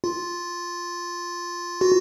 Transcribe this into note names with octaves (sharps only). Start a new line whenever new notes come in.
F4
F#4